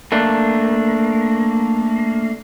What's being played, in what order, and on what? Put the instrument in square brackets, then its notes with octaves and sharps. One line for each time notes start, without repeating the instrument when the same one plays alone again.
[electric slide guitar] A3 A#3 D4